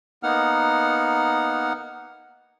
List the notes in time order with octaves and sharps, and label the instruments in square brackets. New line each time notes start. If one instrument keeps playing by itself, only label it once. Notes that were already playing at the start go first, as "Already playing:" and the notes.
[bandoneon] A#3 B3 D#4 F#5 F6